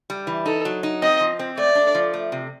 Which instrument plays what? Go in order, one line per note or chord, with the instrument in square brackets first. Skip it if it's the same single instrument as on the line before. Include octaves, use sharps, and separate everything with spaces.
[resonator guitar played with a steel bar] G3
E3
[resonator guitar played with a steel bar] D#4 [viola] A4
[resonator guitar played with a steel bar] F#3
D#4
[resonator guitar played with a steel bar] C4 [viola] D#5
[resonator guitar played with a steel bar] F3
C4
[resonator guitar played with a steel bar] A3 [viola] D5
[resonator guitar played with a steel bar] D4
F3
A3
C3